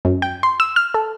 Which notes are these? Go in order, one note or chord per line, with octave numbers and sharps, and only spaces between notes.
F#2
G5
C6
E6
F6
A4